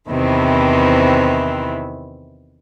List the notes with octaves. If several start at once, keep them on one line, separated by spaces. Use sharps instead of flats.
E2 C3 D#3 E3 C4 E4